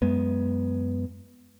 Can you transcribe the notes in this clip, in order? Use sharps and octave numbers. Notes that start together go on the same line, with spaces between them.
F#2 G#3 B3